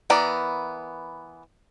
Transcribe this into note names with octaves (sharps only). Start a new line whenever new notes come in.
E3 B3 A#4 D5